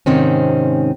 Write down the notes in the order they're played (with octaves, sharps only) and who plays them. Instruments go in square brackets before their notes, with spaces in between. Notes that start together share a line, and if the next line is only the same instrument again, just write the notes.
[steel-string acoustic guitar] G#2 C3 D#3 C4 C#4